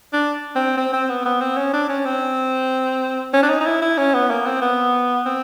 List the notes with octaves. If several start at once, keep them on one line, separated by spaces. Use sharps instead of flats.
D4
C4
C4
C4
B3
B3
C4
C#4
D4
C#4
C4
C#4
D4
D#4
D#4
E4
E4
C#4
B3
A#3
C4
B3
C4